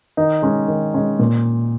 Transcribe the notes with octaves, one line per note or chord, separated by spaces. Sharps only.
D#3 D#4
G#3 C#4
D#3
G#3 C#4
A#2